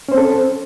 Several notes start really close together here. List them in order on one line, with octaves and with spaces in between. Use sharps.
C#4 C5 C4 A4